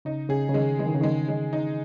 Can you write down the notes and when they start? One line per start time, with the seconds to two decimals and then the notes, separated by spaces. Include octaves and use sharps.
0.05 C#3 D#4
0.29 C#3 G#4
0.49 C#3
0.54 D#3 G#3
0.79 E3 G#3
0.86 D#3
0.94 C#3
1.01 D#3 G#3
1.28 G#3
1.53 D#4